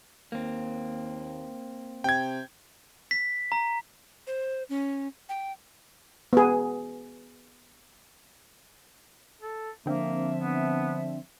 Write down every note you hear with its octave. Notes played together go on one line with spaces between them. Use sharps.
D#2 A#3 C4
C3 G5 G#6
B6
A#5
C5
C#4
G5
B3 G#4
A4
D3 F3 A#3 C4 D4 E5
B3